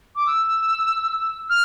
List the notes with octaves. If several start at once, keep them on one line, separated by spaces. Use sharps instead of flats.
D6
E6
F6